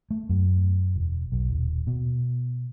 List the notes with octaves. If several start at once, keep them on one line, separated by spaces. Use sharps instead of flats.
A3
F#2
E1
B1
D#1
B2